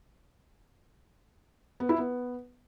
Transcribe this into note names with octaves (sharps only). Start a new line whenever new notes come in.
B3
E4
B3